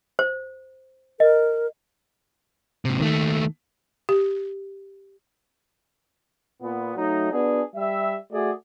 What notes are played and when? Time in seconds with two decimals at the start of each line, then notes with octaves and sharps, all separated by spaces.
0.19 C5
1.20 A#4 D#5
2.85 G#2 C3
3.00 D#2 D#3 A3
4.09 G4
6.61 A#2 B3
6.96 F#3 A3 D#4
7.31 B3 D4 F#4 G#4
7.75 G3 E5
8.32 A3 F#4 G#4 D5